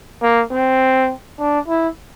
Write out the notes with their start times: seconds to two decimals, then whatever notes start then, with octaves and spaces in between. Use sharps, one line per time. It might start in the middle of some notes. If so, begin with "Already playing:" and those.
0.22 A#3
0.51 C4
1.39 D4
1.68 E4